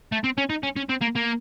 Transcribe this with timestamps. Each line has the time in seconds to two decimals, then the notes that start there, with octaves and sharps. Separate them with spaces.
0.12 A3
0.24 C4
0.38 C#4
0.50 D#4
0.63 C#4
0.76 C#4
0.89 C4
1.01 A#3
1.15 A#3